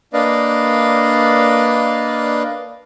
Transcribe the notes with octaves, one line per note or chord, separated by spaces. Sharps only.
A#3 D4 B4 D5 D#5 F5